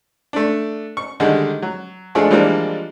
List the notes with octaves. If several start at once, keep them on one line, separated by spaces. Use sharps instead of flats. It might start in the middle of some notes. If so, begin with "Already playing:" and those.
A3 D4
C#6
D3 D#3 G3 G#3
F#3
F3 G#3 A3 D4 F4 G#4
E3 F3 G3 G#3 A#3 D4